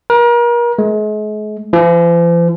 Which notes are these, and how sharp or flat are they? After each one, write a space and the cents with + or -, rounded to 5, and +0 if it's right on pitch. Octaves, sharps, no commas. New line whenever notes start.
A#4 +35
G#3 +40
F3 -45